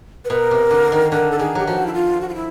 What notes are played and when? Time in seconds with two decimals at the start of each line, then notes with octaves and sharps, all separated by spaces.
0.25 B4
0.30 B2 A#4
0.51 C3
0.71 D3
0.92 D#3
1.11 D3 A#4
1.31 A4
1.39 D#3 G#4
1.55 F#3 G4
1.67 F3 F#4
1.87 E4
1.94 F4
2.21 F#4
2.29 F4
2.35 E4